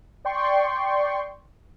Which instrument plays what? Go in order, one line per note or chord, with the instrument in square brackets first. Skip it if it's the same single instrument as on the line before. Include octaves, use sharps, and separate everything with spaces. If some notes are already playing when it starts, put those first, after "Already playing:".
[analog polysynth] D5 G5 C6 C#6